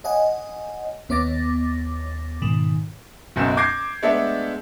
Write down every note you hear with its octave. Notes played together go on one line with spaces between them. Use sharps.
C#5 D#5 F#5 G#5
D#2 B3 C#5 D6 A6 A#6
G#2 B2 D#3
F#1 B1 F#2 B2 G6 E7
D6 G6 G#6 A#6 C7
G#3 A3 B3 D4 A4 E5